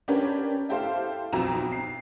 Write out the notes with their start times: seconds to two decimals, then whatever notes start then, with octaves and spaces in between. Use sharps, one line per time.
0.08 C#4 D4 G4 A#4 B4 C#5
0.69 E4 G4 A4 C5 F5
1.33 B1 F2 B2 C4 A#5 E7
1.72 C7